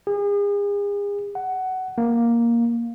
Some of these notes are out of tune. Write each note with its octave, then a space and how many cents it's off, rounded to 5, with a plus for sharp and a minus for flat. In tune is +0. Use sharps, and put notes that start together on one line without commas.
G#4 -40
F#5 +15
A#3 +5